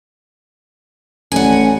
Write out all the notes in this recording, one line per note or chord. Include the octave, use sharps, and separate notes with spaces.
A1 F#5 G#5